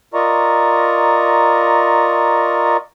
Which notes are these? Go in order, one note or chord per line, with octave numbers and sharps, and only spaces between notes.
F4 A#4 D5 D#5 A#5 C#6